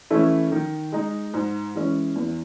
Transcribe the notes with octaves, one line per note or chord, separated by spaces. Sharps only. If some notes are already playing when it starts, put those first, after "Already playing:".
E3 A3 C#4 E4
D#3
G#3 D#4
G#2
E3 G#3 C#4
E2